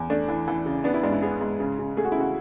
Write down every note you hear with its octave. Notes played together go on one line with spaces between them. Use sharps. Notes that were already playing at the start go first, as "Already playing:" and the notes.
Already playing: E2
A3 D4
E3
E3
C#3
B3 D4
E4
G#2 D4
E4
B3 G#4
G#2
C#3
C#3
A3 G#4
F#4
E4
C#3 F#4